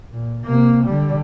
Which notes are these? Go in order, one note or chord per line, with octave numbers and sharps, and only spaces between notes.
A#2
C3 A#3
D3 G3